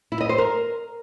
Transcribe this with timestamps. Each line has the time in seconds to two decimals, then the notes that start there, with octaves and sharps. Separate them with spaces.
0.12 E4
0.21 D#5
0.29 C5
0.38 A#4